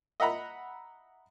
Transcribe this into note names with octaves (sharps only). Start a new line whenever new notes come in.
D#5 E5 F#5 A#5 B5